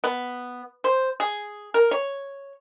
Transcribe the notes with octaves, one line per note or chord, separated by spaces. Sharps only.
B3
C5
G#4
A#4
C#5